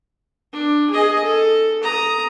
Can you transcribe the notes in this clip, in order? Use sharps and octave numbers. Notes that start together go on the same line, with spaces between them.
D4
G#4 D#5
A4
A#5 D#6